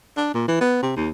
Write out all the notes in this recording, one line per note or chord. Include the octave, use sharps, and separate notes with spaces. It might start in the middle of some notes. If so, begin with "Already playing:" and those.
D4
A#2
E3
B3
C3
D#2